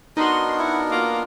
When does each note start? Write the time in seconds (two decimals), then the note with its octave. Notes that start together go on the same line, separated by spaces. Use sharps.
0.17 B3 D4 D#4 F#4 A#4 D#5 C6
0.59 E4 F#5
0.91 A#3 F4